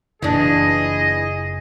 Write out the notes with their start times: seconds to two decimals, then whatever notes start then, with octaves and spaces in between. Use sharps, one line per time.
0.22 F#1 A#2 E3 D4 G#4 D#5